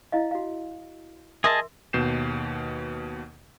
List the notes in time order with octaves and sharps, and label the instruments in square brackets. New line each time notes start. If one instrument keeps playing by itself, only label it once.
[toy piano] E4 D#5 F5
F#4 F5
[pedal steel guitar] G#4 D#5 A5 [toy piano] A#4 E5 C6
[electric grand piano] D#2 B2 G6 C7 E7